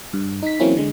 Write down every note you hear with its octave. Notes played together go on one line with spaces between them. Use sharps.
G2
D#4 B6
E3 F#3 A#3 C4 C#4 E4
D3 G#3